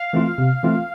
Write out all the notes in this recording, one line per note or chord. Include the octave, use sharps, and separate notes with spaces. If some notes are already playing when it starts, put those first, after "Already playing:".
Already playing: F5
E3 A3 C4 F4
C3
E3 A3 C4 F4